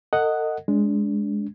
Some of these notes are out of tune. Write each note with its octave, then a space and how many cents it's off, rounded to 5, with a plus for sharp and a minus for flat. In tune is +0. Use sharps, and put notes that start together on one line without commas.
A4 +45 D#5 +0 F#5 +0
G#3 +0 D4 -30